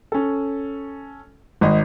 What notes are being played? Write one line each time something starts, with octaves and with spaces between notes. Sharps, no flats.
C#4 A4
G#1 D#5